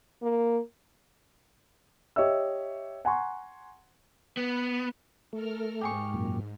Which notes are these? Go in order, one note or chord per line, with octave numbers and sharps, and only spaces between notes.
A#3
G4 C#5 D#5 E5 E6
F#5 G#5 A#5 C6 C#6
B3
A3 A4 A#4 F6
G#2 G4 G#4 C#6
F#2 A#2